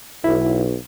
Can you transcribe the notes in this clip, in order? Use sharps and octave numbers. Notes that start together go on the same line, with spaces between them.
B1 E4